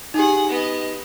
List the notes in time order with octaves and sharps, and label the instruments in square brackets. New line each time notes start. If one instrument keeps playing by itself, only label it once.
[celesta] D#4 G4 [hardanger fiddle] G#4 F#5
[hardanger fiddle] B3 D#5